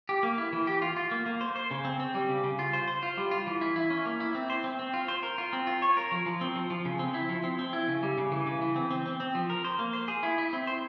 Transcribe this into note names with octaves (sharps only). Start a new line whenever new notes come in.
G4
A#3
E4
E3
G4
F4
F4
A#3
A#3
C5
C5
C#3
C4
C4
G3
C#3
C#3
F4
C5
C5
F4
G3
F4
E3
E4
E4
C#4
A#3
E4
C4
C5
C4
C4
F4
C5
A#4
F4
C4
F4
C#5
A#4
F3
F3
C4
F3
F3
C#3
C4
E4
F3
C4
C4
E4
C#3
G3
C#3
E3
C#3
E3
C4
C4
C4
C4
F3
A#4
C5
A#3
C5
G#4
E4
E4
C4
C5